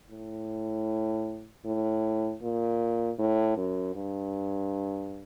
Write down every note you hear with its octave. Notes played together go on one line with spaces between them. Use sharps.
A2
A2
A#2
A2
F#2
G2